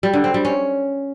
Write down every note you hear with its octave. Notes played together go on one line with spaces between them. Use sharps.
G3
D3
C4
G3
C#4